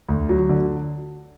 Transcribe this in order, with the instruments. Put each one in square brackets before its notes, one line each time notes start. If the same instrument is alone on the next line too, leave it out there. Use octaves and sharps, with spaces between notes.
[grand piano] D2
F#3
D3